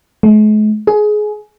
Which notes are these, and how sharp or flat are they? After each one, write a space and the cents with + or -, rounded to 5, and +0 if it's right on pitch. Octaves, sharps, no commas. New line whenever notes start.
G#3 +45
G#4 +20